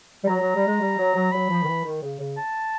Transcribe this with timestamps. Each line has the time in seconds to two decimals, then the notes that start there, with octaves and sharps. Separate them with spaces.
0.23 G3
0.28 F#3 A#5
0.40 F#3
0.55 G3
0.67 G#3
0.80 G3
0.98 F#3
1.15 F#3
1.32 F#3 B5
1.50 F3
1.63 D#3
1.67 E3
1.84 D#3
2.02 C#3
2.19 C#3
2.37 A5